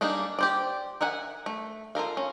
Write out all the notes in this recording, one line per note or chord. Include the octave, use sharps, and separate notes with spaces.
G3 A#3 D4 D#4 G#4
G4 C5 D5
A#4 E5 F#5 G#5
A3
F4 A4 A#4 F5
C#4